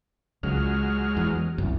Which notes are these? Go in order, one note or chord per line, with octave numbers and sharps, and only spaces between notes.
C#2 F#3 G#3 F6
E2
C2 F#2